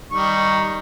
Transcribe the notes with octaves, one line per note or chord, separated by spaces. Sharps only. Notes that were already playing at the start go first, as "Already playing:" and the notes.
D#3 G3 C#6